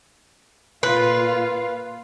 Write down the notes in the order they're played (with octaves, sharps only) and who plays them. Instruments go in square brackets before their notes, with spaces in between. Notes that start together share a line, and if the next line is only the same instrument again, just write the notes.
[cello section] A#2 F4 F5 [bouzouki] B4